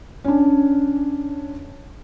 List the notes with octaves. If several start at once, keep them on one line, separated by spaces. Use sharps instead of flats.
C#4 D4